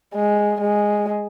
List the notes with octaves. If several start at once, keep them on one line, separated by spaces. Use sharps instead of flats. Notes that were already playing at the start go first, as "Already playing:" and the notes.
G#3
G#3